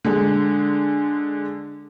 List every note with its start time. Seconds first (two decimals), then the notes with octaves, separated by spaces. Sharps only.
0.05 D3 G#3